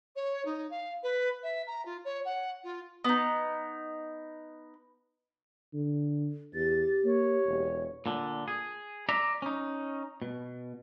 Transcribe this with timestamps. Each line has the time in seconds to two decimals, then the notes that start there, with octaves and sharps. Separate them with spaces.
0.15 C#5
0.45 D#4
0.70 F5
1.03 B4
1.42 E5
1.67 A#5
1.85 F4
2.04 C#5
2.25 F#5
2.63 F4
3.04 B3 D#4
5.73 D3
6.54 E2 G4 A6
7.05 A#3 C#5
7.47 E1
8.06 A#2 D3
8.48 G#4
9.09 D5 E5 A#5
9.42 C#4 D#4
10.22 B2